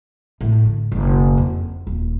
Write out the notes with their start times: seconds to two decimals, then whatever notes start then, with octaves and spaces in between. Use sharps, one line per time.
0.41 A2
0.65 D3
0.92 F#1 B1
1.38 F2
1.87 D#1